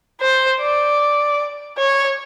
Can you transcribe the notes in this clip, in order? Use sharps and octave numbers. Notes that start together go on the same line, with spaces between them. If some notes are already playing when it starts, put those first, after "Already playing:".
C5
D5
C#5